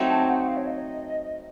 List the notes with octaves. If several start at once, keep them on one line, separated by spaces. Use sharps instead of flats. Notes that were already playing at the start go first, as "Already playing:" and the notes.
Already playing: F#3 A3 C4 D#4
A5
F#5
F#5
F5
C#5
D#5